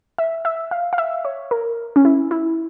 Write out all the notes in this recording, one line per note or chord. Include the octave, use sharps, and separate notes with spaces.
E5
E5
F5
F5
E5
C#5
A#4
C#4
E4
E4